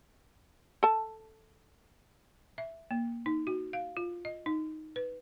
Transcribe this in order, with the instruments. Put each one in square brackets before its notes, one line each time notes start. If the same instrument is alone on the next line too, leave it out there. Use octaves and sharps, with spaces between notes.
[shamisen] A4 A5
[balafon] E5
A#3
D#4
F#4
F5
F4
D#5
D#4
B4